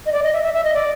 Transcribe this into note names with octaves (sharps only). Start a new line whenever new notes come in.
D#5
D5
D#5
E5
E5
E5
D#5
D5